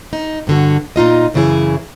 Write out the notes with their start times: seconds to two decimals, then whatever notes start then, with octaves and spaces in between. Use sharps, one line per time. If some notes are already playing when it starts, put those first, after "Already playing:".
0.13 D#4
0.47 G2 D3 F#4
0.96 A#2 D#4 F4 D#5
1.34 F#2 C#3 E3 E4 G#4